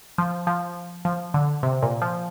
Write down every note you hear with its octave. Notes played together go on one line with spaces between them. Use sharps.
F3
F3
F3
D3
C3
A#2
F3